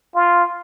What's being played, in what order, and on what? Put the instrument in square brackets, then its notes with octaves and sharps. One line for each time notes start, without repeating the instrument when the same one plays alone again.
[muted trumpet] F4